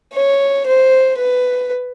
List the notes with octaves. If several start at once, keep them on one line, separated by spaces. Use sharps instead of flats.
C#5
C5
B4